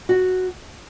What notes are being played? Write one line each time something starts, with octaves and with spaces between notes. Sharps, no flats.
F#4